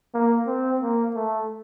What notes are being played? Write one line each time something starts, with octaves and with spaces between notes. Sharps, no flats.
A#3
C4
A#3
A3